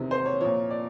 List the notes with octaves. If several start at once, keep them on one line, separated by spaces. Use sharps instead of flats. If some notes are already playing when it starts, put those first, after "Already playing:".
Already playing: E2 C3 D#3
C5
C#5
A#2 F3 C#5
D5